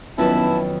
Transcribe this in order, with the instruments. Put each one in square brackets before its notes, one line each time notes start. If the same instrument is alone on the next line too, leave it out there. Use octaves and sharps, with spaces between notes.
[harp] F2 F#3 B4 [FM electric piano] D#3 B3 C#4 [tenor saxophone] E4 [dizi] A5